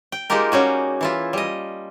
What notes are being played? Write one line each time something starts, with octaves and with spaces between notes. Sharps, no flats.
G5
G#3 A#3 D#4 F4 G4 A#4
G3 C#4 F#4 G#4
E3 E4 F4
G3 D#5